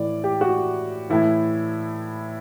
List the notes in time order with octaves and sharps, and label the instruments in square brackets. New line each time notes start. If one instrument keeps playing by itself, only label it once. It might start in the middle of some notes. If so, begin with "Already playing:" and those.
Already playing: [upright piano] A2 E3 D5
G4
F#4
A2 E3 E4